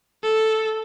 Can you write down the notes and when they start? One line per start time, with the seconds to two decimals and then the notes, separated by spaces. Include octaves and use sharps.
0.23 A4